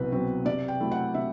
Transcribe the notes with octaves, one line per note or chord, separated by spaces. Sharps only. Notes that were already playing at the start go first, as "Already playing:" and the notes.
Already playing: C2 B2 F#3 C4 B4
B2 F#3 C4
C3 D5
G5
F#3 A3 E4
F#5
C3 E5